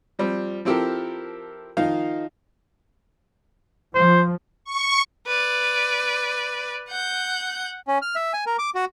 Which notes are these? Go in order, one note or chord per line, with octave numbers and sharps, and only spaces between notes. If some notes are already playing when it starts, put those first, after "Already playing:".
F3 G3 C4
F3 C4 E4 G4 A4 A#4
D#3 F3 D#4 F5
F3 C5
C#6
B4 D5
F#5 G6
C#4
F6
E5
G#5
A#4
D6
F#4